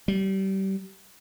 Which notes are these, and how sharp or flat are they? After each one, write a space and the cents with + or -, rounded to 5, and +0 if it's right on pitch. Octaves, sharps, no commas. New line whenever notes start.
G3 -25